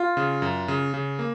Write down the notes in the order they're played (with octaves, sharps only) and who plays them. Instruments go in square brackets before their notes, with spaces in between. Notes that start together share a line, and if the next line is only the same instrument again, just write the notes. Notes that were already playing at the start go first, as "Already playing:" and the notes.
Already playing: [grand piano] F4
[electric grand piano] C#3
F#2
C#3
C#3
A#3